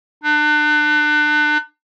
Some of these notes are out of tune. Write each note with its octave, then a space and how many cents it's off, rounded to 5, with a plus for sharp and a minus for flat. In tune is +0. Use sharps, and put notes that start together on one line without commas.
D4 +35